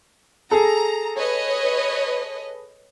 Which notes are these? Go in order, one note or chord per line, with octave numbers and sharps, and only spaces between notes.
G#4 A4 A#5
B4 C#5 D#5